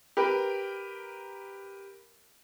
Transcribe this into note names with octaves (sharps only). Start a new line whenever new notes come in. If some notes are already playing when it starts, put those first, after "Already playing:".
G4 A#4 B4